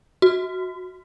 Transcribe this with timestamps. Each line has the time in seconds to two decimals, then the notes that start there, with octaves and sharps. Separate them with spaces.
0.22 F#4